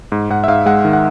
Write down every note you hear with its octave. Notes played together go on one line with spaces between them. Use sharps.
G#2
G#2 F#5
E5
G#2 F5
G#3 F#5
D#3
F#5